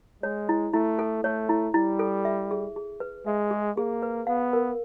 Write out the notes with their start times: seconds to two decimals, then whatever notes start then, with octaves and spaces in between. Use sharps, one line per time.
0.23 G#3 C#5
0.49 E4
0.73 A3 E4
0.99 A4
1.24 A3 C#5
1.49 E4
1.74 G3 E4
1.99 A4
2.25 E5
2.51 G#4
2.76 G#4
3.00 B4
3.26 G#3 E5
3.51 G#4
3.77 A#3 G#4
4.02 B4
4.27 B3 F5
4.53 A#4